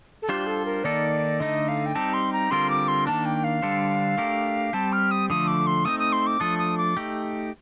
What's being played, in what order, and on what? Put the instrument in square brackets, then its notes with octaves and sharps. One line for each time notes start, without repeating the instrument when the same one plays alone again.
[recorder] A4
[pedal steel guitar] G3 D4 F4 C5 [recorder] G4
[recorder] A4
A#4
[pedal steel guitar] D#3 A#3 D#4 A4 [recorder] D5
[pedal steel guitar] D3 A3 D#4 [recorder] D#5
[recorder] F5
G5
[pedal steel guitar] G3 C4 D#4 G4 [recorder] A5
[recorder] C6
A#5
[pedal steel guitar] D3 G3 C4 F4 A#4 [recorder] C6
[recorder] D6
C6
[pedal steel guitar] D#3 A#3 D4 [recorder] A5
[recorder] G5
F5
[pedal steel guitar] D3 G3 D4 A4 C5
A3 D4 G4 A#4
[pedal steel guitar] G3 C4 G4 [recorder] A5
[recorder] F6
D#6
[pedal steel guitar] D3 F3 A3 [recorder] D#6
[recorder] D6
C6
[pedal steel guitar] A3 C4 D#4 [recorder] D#6
[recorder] D#6
C6
D6
[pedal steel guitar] F3 A3 D4 A4 [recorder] D#6
[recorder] D#6
D6
[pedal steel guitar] A3 D#4 G4